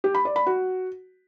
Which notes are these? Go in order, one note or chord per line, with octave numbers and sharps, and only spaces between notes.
G4
B5
D5
B5
F#4